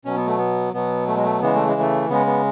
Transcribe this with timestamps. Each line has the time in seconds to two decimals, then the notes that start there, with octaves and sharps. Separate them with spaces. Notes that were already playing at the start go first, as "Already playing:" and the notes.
0.05 B2 F#3 C#4
0.16 B3
0.27 A3
0.38 B3
0.73 B2 F#3 B3
1.07 A3
1.16 G#3
1.24 A3
1.41 C#3 E3 G#3 B3
1.55 A3
1.68 G#3
1.81 A3
2.09 C#3 G#3 B3
2.26 B3